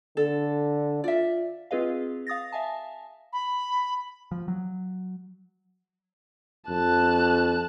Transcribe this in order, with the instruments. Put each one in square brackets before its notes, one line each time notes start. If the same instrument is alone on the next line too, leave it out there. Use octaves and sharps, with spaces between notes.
[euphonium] D3 [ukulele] A4
[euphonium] F4 [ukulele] D5 E5
[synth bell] C4 F4 G#4 B4 D#5 F5
F5 D#6 A6 A#6
E5 F5 G#5 A5
[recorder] B5
[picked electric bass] F3
F#3
[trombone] F2 [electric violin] A5 F#6